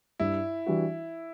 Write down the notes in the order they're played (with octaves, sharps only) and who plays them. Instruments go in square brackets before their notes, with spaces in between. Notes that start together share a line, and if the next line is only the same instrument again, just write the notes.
[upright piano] G2 [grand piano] E4
[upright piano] E3 G3 D4 F#4